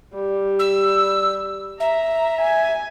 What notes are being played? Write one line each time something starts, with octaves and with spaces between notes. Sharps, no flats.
G3
E6
E5 A#5
G#5